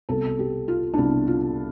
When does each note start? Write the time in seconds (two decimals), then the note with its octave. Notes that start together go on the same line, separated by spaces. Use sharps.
0.09 C2 B2 A4
0.39 G4
0.68 F4
0.94 D4
0.98 C2 B2 E4
1.27 F4